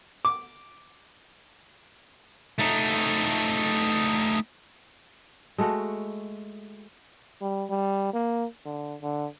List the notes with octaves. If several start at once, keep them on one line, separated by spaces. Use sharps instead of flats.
D6
A3 D#4
G#3 A3 F#4
G3
G3
A#3
D3
D3